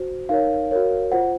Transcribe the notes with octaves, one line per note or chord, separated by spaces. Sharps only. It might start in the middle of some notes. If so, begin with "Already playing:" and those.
Already playing: F#4 C5
D#4 A#4 C#5 F5
F#4 A#4 C#5
F4 C5 F#5